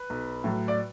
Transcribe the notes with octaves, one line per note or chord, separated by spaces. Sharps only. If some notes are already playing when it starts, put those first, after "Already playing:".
Already playing: B4
B1
A2 F#3
D5